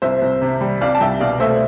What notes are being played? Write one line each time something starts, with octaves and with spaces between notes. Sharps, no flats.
C2 C5 E5
C2
C3
G3
C2 D5 F5
A5
C2 E5 G5
B2 D5 F5
A3 C5 E5